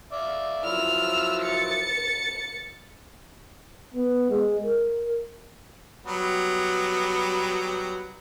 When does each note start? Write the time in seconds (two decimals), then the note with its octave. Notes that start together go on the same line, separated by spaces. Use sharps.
0.12 D5 E5 F5
0.64 F3 F#3 E4 E6 F6
1.42 A6 C#7
3.94 B3
4.30 G#3
4.63 A#4
6.06 F#3 G3 B3